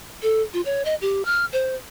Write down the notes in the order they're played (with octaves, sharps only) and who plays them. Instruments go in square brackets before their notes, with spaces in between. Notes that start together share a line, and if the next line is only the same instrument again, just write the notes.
[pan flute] A4
F4
C#5
D#5
G4
F6
C5